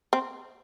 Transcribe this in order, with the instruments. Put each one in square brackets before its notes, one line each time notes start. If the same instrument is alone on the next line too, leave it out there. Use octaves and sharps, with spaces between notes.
[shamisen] C4